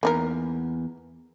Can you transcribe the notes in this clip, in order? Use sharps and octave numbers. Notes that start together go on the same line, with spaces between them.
E2 A#3 D#4 A#4